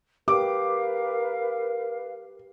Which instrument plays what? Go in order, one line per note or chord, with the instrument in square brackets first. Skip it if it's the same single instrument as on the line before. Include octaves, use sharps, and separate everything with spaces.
[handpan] G4 [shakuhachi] A#4 [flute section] B4 F5 [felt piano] D6